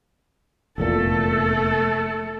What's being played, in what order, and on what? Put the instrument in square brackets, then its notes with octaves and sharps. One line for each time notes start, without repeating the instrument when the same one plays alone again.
[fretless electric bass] F1 E2 A#2 [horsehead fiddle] A3 A4